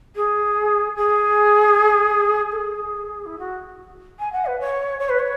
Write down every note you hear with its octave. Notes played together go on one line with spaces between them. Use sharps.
G#4
G#4
A4
G#4
E4
F#4
G#5
F#5
B4
C#5
C#5
B4
C#5